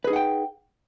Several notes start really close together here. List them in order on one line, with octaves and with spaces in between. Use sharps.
B4 G#4 D#4 F#5 G5